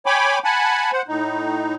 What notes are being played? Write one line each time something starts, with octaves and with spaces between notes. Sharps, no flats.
C#5 G5 G#5 B5 D6
F#5 G#5 A5 B5
C5 F#5
A2 D#4